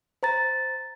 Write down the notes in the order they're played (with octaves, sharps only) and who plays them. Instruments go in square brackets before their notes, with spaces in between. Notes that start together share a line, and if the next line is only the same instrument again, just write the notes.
[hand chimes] C5 A#5 A6